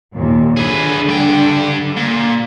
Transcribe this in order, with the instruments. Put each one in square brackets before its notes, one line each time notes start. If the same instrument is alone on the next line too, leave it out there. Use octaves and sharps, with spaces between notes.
[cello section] D#2 A#2
[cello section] D3 [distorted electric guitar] G#4 B4
[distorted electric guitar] G2 G5
A#2